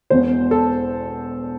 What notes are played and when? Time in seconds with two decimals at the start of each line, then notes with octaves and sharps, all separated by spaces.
0.10 E1 E2 B2 C5
0.51 A4